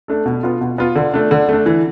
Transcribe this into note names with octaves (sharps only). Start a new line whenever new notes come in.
A3 D4 A4
B2
B3 F4
B2
B3 F4
D3
A3 D4
D3
A3 D4
E3